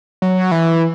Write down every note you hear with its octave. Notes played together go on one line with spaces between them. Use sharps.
F#3
E3